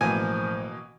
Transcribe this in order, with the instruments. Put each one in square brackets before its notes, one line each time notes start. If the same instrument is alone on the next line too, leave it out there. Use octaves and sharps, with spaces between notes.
[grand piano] A1 [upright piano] B2 E3 A#3 [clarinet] F3 [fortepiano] G#5